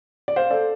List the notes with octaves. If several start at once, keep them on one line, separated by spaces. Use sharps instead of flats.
D5
C5 F5
A4 D5